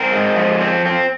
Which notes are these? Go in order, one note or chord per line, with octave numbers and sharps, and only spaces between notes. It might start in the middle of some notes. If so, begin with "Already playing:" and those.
Already playing: C4 A#4
G#3
F3
C4
C4